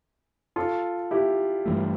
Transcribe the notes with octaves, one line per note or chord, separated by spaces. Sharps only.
F4 A4
E4 G4
G2 E3 A3